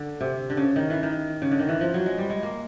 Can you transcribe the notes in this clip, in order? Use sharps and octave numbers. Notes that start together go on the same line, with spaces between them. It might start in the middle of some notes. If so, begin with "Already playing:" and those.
Already playing: D3
C3
D3
C#3
D#3
E3
D#3
C#3
D3
D#3
E3
F3
F#3
G#3
G3
G#3
A#3